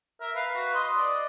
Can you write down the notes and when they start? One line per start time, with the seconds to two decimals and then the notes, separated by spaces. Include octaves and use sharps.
0.21 A#4 E5
0.35 B4 F5
0.55 F#4
0.74 D#5 C6
0.96 D5